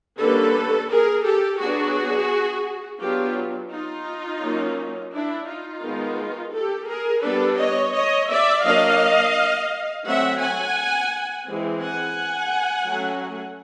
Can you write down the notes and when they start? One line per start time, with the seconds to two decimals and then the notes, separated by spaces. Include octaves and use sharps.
0.19 D3 G3 A#3 C#4 A4 B4
0.89 G#4 A#4
1.25 G4 A4
1.61 F#3 B3 D4 F#4 G#4
3.01 F#3 B3 D4 F4 G4
3.71 D#4 F4
4.42 F#3 A#3 C#4
5.13 D4 E4
5.47 D#4 F4
5.82 D#3 G#3 B3
6.53 G4 A4
6.89 G#4 A#4
7.23 G3 B3 D4 A4 B4
7.58 C#5 D#5
7.94 C#5 D#5
8.30 D5 E5
8.64 F#3 A#3 D4 D#5 F5
10.05 F#3 A3 C4 E5 F#5
10.40 F#5 G#5
11.46 E3 G#3 C4
11.81 F#5 G#5
12.87 F#3 A3 C#4